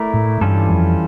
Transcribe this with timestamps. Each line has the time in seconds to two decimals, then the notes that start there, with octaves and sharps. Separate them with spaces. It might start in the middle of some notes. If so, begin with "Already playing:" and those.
Already playing: A3 E4 A#4 D5
0.14 A2
0.41 G2 E3 G3 C#4 F4 A4
0.70 F2